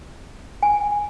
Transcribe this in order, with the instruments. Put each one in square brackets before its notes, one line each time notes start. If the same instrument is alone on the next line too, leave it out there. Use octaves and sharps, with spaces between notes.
[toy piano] G#5